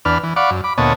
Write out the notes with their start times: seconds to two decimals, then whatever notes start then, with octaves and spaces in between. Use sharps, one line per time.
0.05 E2 D4 B4 F6
0.23 E3
0.36 D5 F5 F#5 B5 C#6 D6
0.51 F#2
0.64 B5 D6
0.78 D2 A#2 B3 C#5 D#5 A5